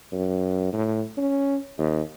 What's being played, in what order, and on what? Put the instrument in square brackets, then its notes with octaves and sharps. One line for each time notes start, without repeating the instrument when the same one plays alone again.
[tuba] F#2
A2
C#4
D#2